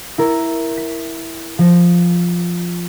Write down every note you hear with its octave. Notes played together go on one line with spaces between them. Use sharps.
E4 A#4
B6
F3 A#6